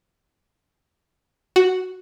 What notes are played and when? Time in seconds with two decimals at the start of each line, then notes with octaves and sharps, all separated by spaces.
1.56 F#4